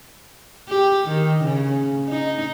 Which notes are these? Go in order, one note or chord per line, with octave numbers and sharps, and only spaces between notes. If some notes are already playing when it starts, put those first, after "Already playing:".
G4
D#3
C#3
D#4